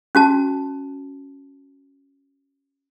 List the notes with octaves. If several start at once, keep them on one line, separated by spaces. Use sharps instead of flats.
C#4 F#4 A5